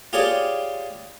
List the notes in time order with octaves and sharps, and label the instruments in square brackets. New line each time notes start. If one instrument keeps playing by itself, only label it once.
[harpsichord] F4 G4 G#4 C#5 D5